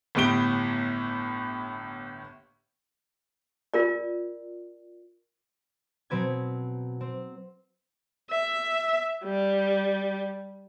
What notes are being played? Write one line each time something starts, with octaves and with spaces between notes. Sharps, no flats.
G1 A2 B3 G4 D7 G7
F4 A#4 D5
B2 F#3 C4 B4 G#6
C4
E5
G3